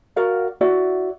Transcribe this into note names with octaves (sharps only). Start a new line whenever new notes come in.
F#4 A#4 D5 F5
E4 F#4 D5